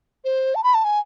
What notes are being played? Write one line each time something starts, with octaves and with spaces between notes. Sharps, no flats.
C5
A5
B5
A5
G#5